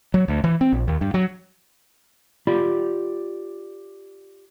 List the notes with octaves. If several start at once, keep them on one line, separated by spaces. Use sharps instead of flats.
F#3
D2
E3
C4
A#1
D#2
G2
F#3
F4 G4 D5 B5